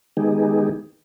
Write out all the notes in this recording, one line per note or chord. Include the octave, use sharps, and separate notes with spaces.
D#3 G#3 B3 D#4 G4 G#4